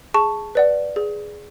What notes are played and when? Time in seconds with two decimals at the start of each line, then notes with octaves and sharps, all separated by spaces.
0.14 G#4 A5 C#6
0.55 B4 D5 F#5
0.96 G#4